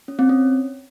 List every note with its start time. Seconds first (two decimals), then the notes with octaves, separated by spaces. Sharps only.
0.08 C#4
0.19 C4
0.29 C#4